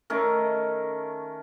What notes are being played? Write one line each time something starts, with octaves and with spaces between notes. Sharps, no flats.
D#3 A3 C#4 A#4